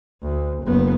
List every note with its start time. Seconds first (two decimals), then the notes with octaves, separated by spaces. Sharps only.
0.22 D2
0.64 F#1 B3